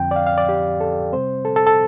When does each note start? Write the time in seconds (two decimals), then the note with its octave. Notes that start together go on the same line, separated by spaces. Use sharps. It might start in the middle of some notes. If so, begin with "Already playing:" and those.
Already playing: F2 D3 F3 C4 G5
0.11 D5
0.16 F5
0.27 F5
0.38 D5
0.49 G4
0.80 A4
1.13 C3 G3 C4 C5
1.45 A4
1.56 A4
1.67 A4